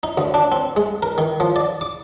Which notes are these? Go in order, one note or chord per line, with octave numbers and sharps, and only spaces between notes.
D#4
D2
D4
C4
G#3
A#4
D#3
F3
D5
D6